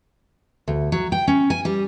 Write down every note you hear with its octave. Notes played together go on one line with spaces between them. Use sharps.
D2
F#3
G5
C#4
G#5
G3